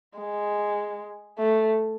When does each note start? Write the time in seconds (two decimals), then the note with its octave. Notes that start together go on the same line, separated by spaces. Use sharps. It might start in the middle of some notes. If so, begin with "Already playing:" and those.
0.17 G#3
1.39 A3